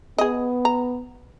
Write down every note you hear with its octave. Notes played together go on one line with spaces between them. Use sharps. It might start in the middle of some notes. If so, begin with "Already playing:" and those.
B3 G#4 D#5
A#5